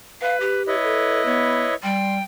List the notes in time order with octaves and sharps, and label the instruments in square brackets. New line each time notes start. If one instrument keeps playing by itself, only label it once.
[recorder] B4 [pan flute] F5
[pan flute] G4
[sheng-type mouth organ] E4 B4 D#5 [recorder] C#5
[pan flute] A4
[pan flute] B3 [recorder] C#5
[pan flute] G3 [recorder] G5 [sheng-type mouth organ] C6